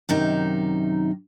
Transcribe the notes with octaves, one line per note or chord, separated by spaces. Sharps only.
F#2 C3 D#3 D#4